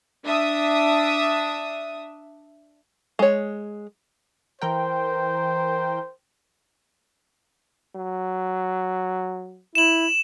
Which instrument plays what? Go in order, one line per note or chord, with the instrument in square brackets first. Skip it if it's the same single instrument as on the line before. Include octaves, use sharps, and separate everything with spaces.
[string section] D4 E5 D#6
[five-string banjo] G#3 C#5
[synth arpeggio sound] E3 A#4 G5 [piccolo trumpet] C5
[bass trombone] F#3
[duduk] E4 [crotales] E7 F#7